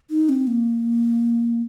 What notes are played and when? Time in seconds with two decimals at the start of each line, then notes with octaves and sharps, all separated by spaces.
0.10 D#4
0.29 C4
0.47 A#3